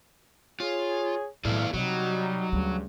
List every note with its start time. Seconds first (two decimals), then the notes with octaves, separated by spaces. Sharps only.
0.60 F4 G#4 C#5
1.45 F2 A2 F#3 A3 E4 G#4 D5 F5
1.74 C3 F#3 G3 D#4 F#4
2.52 D2 G2 C#3 G3